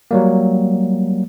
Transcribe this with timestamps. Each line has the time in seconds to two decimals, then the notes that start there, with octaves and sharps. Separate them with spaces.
0.11 F#3 G3 A#3